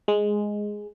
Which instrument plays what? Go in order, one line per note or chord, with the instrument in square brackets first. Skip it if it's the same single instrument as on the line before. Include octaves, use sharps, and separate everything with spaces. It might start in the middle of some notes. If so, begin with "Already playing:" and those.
[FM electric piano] G#3